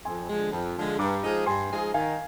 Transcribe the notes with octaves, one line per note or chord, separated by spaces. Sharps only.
F2 G#5 C6
D3 F3 G#3
F2
D3 F3 G#3
G2 A#5 D6
F3 G#3 D#4 G#4
G2 G#5 C6
F3 G#3 D#4 G#4
D#3 F5 G#5